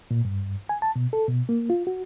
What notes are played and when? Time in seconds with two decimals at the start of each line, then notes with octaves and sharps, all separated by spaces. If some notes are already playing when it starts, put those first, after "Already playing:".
0.11 A#2
0.25 G2
0.69 G#5
0.82 A5
0.96 B2
1.13 A4
1.28 B2
1.49 A#3
1.70 F4
1.87 F#4